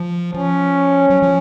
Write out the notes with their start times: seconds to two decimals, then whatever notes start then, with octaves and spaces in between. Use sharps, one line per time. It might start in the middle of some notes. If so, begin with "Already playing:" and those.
Already playing: F3
0.33 F3 C#4
1.10 F#3
1.22 F3